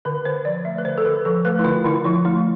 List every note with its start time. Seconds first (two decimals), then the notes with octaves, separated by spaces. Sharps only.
0.05 D3 B4
0.25 D3 C5
0.45 F3 D5
0.65 A3 E5
0.78 B4
0.85 D3 C5
0.98 A4
1.05 D3 B4
1.25 F3 A4
1.45 A3 B4
1.59 E4
1.65 D3 F4
1.84 D3 E4
2.04 F3 E4
2.25 A3 E4